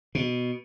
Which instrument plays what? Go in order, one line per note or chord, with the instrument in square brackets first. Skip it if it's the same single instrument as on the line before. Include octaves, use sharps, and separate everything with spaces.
[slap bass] B2